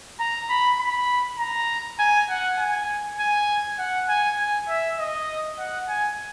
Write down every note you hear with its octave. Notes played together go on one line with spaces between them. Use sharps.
A#5
B5
B5
A#5
G#5
F#5
G#5
G#5
F#5
G#5
G#5
E5
D#5
F#5
G#5